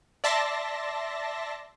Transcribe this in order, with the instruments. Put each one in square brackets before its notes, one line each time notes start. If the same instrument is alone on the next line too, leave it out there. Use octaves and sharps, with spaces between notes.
[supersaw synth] D5 E5 A5 C6 A#6